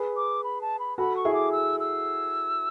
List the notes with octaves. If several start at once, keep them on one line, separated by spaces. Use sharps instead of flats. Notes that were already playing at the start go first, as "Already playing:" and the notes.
Already playing: G#4 B4
D6
B5
A5
B5
F#4 A4 B5
C#6
E4 G#4
D6
E6
E6